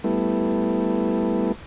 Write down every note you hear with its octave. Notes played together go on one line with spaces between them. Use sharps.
G3 A3 B3 E4